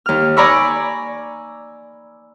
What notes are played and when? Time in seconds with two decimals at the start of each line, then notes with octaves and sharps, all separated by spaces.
0.06 D#2 F6
0.36 D5 G#5 A#5 B5 C#6 E6